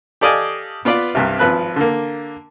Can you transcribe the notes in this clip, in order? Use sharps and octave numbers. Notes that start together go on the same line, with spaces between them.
G4 A4 D5 D#5 F5 G#5
B3 F4 B4 D5
C2 G2 C3
G#1 F3 B4 F#6
D3 A#3